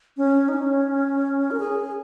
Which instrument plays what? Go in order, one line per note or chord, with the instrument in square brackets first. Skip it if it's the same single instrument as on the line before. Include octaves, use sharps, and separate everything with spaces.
[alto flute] C#4
D#4
C#4
A#4
G#4